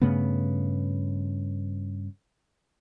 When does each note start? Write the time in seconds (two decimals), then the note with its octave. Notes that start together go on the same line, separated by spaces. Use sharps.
0.01 G2 C#3 A3 B3